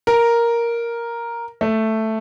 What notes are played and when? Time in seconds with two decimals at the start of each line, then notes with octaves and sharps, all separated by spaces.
0.07 A#4
1.61 A3